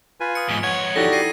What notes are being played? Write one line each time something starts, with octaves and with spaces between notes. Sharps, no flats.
F4 B4 G#5
D#6 C#7
E2 G#2 B6
F2 C#5 F#5 G#6
D#4 E4 F#4 G4 A4 D5 A#6
A#6 C7 D#7